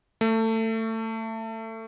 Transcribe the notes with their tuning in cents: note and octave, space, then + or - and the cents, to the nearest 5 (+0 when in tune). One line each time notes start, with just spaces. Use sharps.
A3 +25